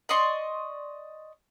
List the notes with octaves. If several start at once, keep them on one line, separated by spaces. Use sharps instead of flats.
D5 D#5 C6 C#6